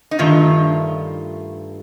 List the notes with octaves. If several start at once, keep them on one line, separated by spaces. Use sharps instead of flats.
D#4
G2 D#3 A3 F4